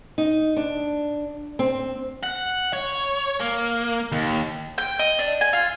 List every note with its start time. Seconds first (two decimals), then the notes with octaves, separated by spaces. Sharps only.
0.18 D#4
0.57 D4
1.59 C4
2.23 F#5
2.73 C#5
3.40 A#3
4.12 D#2
4.78 G5
4.99 D#5
5.19 D4
5.41 G#5
5.53 F4